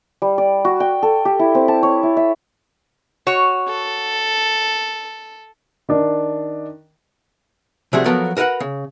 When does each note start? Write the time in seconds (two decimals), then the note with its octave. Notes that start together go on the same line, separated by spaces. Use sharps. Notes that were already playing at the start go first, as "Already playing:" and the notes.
0.22 G3
0.38 D5
0.65 F#4
0.80 G5
1.03 A4
1.25 G4
1.39 E4
1.55 C4
1.68 A5
1.83 C#5
2.03 E4
2.17 E5
3.27 F#4 C#5
3.69 A4
5.89 D#3 D4
7.93 C3 F3 G3 A3 F#4 G#4
8.05 F3 F#3 B3 F#4 A4 A#4
8.37 F#4 A#4 B4 F5 F#5
8.60 C#3